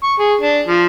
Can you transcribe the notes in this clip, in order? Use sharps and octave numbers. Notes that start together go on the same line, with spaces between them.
C#6
G#4
D4
F3